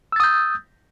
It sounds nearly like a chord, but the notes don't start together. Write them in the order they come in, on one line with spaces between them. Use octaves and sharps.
E6 A6 D#6 G6